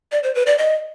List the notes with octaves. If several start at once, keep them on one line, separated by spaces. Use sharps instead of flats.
D5
C5
B4
D5
D#5